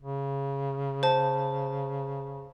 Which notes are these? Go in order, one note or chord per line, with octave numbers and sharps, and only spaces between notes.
C#3
C5 A5